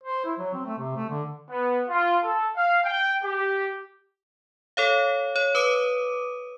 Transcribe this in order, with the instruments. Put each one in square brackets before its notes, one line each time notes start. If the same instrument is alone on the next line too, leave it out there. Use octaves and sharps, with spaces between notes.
[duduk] C5
E4
F#3
C4
A3
C3
A3
D3
[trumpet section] B3
F4
A4
F5
G5
G4
[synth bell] A4 C#5 F5
C#5
B4 D6 D#6 D#7